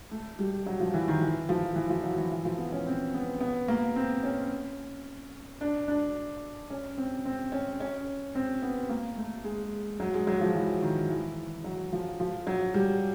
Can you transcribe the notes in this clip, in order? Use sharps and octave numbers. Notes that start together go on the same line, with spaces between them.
A3
G3
F#3
F3
E3
D#3
E3
F3
E3
F3
F#3
E3
E3
F3
B3
C#4
C4
B3
B3
A#3
C4
C#4
D4
D4
C#4
C4
C4
C#4
C#4
C4
B3
A#3
A3
G#3
F#3
G#3
F#3
F3
E3
D#3
E3
F#3
F3
F3
F#3
G3